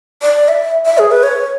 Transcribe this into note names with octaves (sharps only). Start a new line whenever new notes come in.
D5
E5
E5
G#4
B4
C#5